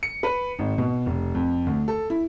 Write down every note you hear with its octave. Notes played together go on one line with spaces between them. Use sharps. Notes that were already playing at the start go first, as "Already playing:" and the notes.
C#7
B4
G#1
B2
F1
F2
D2
A4
E4